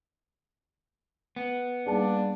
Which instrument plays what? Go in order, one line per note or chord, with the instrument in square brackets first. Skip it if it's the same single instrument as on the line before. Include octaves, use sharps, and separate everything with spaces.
[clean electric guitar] B3
[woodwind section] G3 A#3 [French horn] D4 [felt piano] G#4 A5